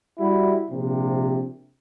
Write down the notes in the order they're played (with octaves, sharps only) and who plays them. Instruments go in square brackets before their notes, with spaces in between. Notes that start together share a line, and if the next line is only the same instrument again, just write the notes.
[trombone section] G3 E4 F#4
A#1 C3